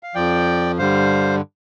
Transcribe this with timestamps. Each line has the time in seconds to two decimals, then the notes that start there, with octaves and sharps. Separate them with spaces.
0.03 F5
0.15 F2 F3 D5 G5
0.78 G2 D3 G3 C5 F5